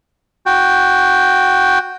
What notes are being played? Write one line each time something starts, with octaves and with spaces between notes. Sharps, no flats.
F#4 G5